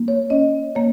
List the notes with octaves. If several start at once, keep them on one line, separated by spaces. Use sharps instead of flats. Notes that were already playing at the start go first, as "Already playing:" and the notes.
Already playing: A#3
C#5
C#4 D#5
A#3 C#5